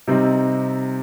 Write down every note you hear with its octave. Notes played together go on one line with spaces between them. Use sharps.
C3 G3 C4 D#4